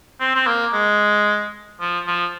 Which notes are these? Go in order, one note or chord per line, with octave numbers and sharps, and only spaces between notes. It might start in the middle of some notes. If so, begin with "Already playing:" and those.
C4
C4
A#3
G#3
F3
F3